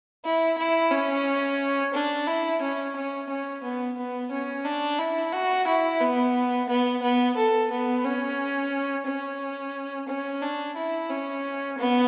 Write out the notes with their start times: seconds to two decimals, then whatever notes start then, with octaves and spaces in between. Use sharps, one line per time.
0.25 E4
0.58 E4
0.92 C#4
1.94 D4
2.27 E4
2.61 C#4
2.96 C#4
3.29 C#4
3.64 B3
3.97 B3
4.32 C#4
4.65 D4
4.99 E4
5.33 F#4
5.67 E4
6.01 B3
6.69 B3
7.02 B3
7.37 A4
7.71 B3
8.04 C#4
9.06 C#4
10.08 C#4
10.42 D4
10.76 E4
11.10 C#4
11.77 B3